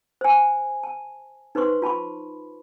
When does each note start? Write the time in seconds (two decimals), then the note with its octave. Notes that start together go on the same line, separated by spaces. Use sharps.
0.21 C5 G#5
0.83 A5
1.55 D#4 B4 C5 C6 C#6
1.82 F4 A5 B5 C#6